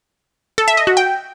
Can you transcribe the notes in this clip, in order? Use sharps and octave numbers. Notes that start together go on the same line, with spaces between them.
A4
E5
D#5
F#4
G5